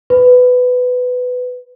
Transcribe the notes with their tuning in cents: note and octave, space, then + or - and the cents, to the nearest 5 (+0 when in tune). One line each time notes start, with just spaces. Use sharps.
B4 +15